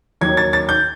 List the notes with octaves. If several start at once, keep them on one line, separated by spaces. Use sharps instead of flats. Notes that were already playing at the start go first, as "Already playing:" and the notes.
D#2 D#3 F#3 G#6
A6
A6
G6